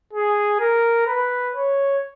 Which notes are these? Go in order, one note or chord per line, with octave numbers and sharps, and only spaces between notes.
G#4
A#4
B4
C#5